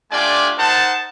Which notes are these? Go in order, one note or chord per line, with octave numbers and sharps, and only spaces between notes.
A3 D4 F4 G4 D5 G#5
D#4 A#4 C5 F#5 A5